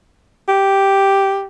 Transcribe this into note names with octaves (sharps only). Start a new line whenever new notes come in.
G4